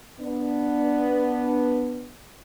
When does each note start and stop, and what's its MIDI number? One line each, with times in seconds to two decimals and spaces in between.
0.20 2.10 59
0.20 2.10 62